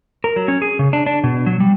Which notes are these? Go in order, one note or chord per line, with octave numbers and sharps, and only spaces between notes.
A#4
F#3
C#4
G#4
C#3
D4
D4
B2
F#3
G3